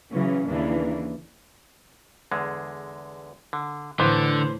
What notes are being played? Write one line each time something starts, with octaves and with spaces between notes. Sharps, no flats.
C#3 E3 F#3 C#4
D#2 C#3 E3 A#3 D4
E2 D3 G#3
D3
A2 D3 E3 B3 C5